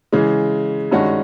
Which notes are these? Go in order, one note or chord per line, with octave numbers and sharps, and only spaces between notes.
C#3 E3 G#3
G2 D#3 G#3 C#4 F#4